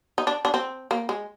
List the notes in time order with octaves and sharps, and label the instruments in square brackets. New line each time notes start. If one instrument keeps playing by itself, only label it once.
[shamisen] D#4
D4
D4
C4
A#3
G#3